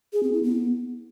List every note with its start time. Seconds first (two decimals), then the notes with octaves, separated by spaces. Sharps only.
0.13 G#4
0.23 C4
0.33 E4
0.43 B3